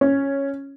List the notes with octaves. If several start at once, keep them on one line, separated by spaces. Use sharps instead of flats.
C#4